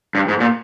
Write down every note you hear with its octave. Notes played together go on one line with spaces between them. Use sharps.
G2
G#2
A#2